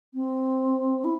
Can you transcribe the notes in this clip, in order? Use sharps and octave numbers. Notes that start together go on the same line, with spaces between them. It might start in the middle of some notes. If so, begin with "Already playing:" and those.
C4
E4